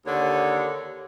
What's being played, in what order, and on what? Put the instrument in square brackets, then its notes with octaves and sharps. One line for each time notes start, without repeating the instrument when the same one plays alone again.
[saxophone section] D#2 D3 C#5